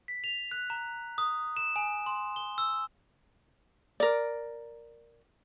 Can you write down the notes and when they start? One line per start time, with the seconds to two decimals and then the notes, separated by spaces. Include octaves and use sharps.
0.08 B6
0.24 F7
0.51 F#6
0.70 A#5
1.18 D#6
1.57 E7
1.76 G#5
2.06 C6
2.36 G7
2.58 E6
4.00 A#4 D5